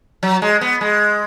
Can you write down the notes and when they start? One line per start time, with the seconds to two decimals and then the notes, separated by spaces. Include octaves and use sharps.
0.23 F#3
0.42 G#3
0.61 B3
0.81 G#3